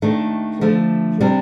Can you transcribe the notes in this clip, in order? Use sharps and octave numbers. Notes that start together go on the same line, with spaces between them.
D#2 D#3 A3 D4
D3 F3 A3
C3 G3 D4